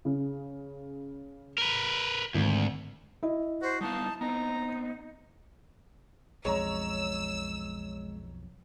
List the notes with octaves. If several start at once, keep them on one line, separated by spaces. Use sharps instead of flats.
C#3
A#4 B4
G#1 D2
E4 D#5
F#4 C5
G3 B3 D#4 F5 A5
B3 C4 D#4 A#5
B1 F2 G#3 C#5 A#5 E6